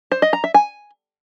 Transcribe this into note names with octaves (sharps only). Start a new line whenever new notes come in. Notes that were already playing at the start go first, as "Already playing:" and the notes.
C5
D#5
A#5
E5
G#5